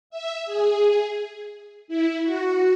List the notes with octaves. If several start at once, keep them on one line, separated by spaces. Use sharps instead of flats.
E5
G#4
E4
F#4